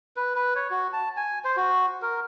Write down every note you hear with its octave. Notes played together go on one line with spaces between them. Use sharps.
B4
B4
C#5
F#4
A5
G#5
C5
F#4
A#4